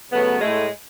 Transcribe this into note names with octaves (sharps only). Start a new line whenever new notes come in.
C#3 F#3 A3 B3
A2 G#3 A3